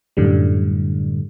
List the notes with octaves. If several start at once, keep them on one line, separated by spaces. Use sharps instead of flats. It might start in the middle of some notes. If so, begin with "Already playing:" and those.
F#2 A2 D3 G3